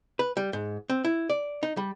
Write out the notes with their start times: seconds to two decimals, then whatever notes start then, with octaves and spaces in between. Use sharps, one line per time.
0.19 B4
0.37 G3
0.53 G#2
0.90 C4
1.05 E4
1.30 D5
1.63 D#4
1.77 G3